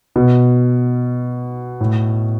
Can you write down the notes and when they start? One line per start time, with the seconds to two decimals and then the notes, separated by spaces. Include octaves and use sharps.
0.16 B2
1.81 A2